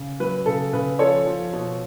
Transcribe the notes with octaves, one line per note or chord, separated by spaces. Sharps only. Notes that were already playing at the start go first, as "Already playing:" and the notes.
Already playing: C#3
F#3 B4
C#3 A4
C#3 B4
F3 A4 C#5
F3
B2